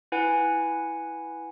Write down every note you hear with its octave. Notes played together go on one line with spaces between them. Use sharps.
E4 B4 F#5 G#5